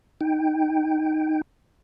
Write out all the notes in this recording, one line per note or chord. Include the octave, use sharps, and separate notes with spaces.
D#4 G5